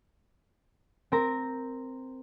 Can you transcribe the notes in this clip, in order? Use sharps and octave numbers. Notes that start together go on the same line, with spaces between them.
C4 A#4 A#5